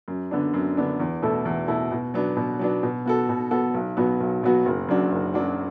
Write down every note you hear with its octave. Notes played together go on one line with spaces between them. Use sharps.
F#2
D3 B3 D4
F#2
D3 B3 D4
E2
B2 A3 E4 A4
E2
B2 A3 E4 A4
B2
F#3 B3 D4
B2
F#3 B3 D4
B2
B3 F#4 A4
B2
B3 F#4 A4
B1
B2 F#3 B3 F#4
B1
B2 F#3 B3 F#4
F#1
F#2 F#3 D4 F#4
F#1
F#2 F#3 D4 F#4